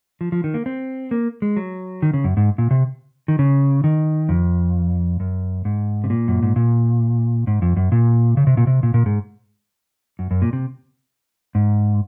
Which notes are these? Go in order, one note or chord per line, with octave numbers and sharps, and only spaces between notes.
F3
F3
D#3
A#3
C4
A#3
G#3
F#3
D#3
C#3
F#2
G#2
A#2
C3
D#3
C#3
D#3
F2
F#2
G#2
C3
A#2
F#2
G#2
A#2
G#2
F2
F#2
A#2
C#3
C3
A#2
C3
A#2
A#2
G#2
F#2
F#2
A#2
C3
G#2